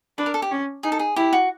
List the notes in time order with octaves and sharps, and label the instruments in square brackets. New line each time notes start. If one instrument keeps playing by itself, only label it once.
[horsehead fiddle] D4 [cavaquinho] B4
[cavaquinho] A#4
A4
G4
[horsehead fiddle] C#4
[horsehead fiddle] D#4 [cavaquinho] G#4
[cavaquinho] A4
G#4
[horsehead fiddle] E4 [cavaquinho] G4
[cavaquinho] F#4